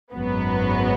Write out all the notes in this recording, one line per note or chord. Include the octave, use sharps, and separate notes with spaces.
G#1 F#2 F#3 B3